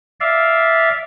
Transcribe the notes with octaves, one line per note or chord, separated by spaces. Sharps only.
D5 E5 F5